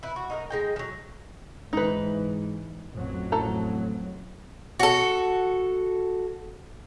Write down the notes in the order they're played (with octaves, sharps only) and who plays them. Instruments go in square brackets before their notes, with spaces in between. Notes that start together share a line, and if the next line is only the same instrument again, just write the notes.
[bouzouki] E4 B4
F#4
D#4 E4 A#4
G#3 D#4 G5
F3 F#3
[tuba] G#2 [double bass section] E3 [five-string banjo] D#4 B4
[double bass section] A1 F2 F#3
[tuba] A2 [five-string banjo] A4 A#5
[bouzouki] F#4 A4